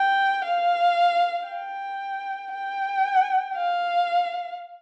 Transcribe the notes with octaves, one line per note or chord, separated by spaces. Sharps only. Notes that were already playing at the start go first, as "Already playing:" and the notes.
Already playing: G5
F5
G5
G5
F5